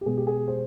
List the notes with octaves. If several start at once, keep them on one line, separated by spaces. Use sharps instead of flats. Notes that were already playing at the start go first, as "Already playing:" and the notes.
G4
B2 G#3 B3 G#4
G4
G#4
C5